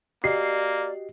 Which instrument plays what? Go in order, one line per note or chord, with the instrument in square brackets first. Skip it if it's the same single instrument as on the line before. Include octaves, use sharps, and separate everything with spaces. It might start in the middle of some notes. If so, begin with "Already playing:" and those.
[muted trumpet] A#3 [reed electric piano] F#4 G4 D#5 [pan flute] D5 [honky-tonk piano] C7